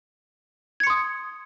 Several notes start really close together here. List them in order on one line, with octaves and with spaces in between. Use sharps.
G#6 C#7 C6 D#6